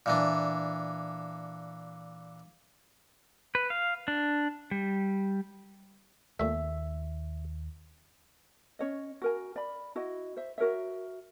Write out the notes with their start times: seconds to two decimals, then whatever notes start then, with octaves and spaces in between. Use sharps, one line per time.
0.06 A#2 E3 D4
3.55 B4
3.70 F5
4.08 D4
4.71 G3
6.40 D#2 A#2 A3 E5
8.79 C#4 C#5 D#5
9.22 F#4 A#4 G#5
9.56 D5 B5
9.95 E4 F#4 D#5
10.37 C5 E5
10.58 F#4 A#4 C#5 E5